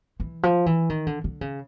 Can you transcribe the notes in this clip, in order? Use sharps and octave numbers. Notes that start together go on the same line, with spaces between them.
E3
F3
E3
D#3
D3
D3
C#3